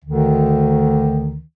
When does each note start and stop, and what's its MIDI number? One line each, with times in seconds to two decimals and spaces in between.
0.05 1.39 38
0.05 1.39 50
0.05 1.39 51